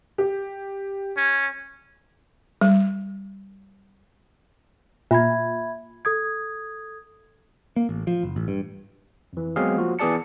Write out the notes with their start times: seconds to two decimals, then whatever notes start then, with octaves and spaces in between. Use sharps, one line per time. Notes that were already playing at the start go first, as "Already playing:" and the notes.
0.18 G4
1.17 C#4
2.61 G3
5.11 A#2 E5 B5 G#6
6.05 A4 D#6 G#6
7.76 A#3
7.89 A1
8.07 F3
8.23 F#1
8.36 A1
8.48 G2
9.33 F2 E3
9.56 F#3 G#3 B3 C4 G#4 F5
9.77 F3 A#3 F4 F#4
9.99 E3 B3 G#4 D5 A5 C#7